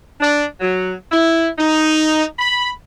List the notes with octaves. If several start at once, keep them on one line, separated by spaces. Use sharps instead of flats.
D4
F#3
E4
D#4
B5